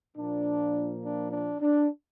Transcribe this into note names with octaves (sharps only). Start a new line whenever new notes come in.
A#2 F3 A#3 D4
D4
D4
D4